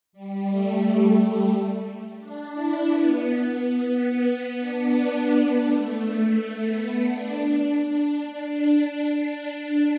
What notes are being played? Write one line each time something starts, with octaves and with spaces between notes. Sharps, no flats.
G3
A3
D4
E4
B3
B3
D4
A3
A3
B3
D4
D4
D4